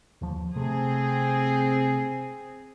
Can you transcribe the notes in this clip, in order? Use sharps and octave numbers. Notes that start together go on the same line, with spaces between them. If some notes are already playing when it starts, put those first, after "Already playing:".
D#2 F3
C3 A3 C4 G#4